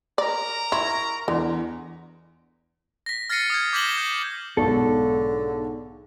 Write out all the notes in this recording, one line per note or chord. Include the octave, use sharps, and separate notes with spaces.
A#4 D5 A#5
E4 C#6
E2 D3
A#6 B6
F6 A6 A#6 C7 C#7 D#7
D#6 F6 G#6
D6 G6 B6 E7 F#7 G7
G6
B1 G#2 D3 A4 C#6